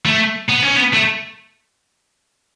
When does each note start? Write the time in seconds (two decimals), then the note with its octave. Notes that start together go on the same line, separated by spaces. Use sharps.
0.05 A3
0.49 B3
0.63 C#4
0.77 B3
0.94 A3